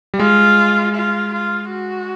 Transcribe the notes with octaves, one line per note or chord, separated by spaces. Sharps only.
G3
G#3 F4
F4
F4
F#4